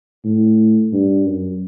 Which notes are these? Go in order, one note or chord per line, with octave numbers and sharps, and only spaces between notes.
A2
G2
F#2